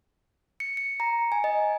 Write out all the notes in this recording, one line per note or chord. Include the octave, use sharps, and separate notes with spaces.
C#7
C#7
A#5
G#5
D#5